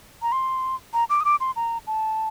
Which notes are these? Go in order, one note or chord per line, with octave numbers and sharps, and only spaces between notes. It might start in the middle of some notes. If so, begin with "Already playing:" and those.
A#5
C6
A#5
D6
D#6
D6
C6
A#5
A5